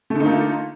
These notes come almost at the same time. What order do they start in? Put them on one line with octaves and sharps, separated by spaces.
A3 D3 D#4 A#3 F4